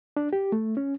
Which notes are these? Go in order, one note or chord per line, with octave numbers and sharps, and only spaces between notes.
D4
G4
A3
C#4